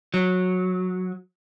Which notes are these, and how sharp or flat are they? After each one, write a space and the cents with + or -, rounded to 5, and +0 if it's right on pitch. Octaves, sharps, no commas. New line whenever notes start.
F#3 -15